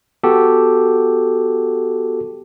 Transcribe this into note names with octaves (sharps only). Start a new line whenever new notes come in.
B3 F#4 G4 A4